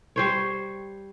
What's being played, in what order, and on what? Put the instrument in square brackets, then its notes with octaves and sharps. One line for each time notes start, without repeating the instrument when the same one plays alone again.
[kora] G3 C5 C#5